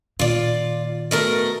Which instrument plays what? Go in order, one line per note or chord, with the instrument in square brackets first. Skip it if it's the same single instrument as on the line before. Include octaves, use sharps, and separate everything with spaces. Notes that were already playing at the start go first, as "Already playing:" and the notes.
[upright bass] A#2 D#3 [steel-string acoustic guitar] F4 D5
[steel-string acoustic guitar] B2 A3 A#4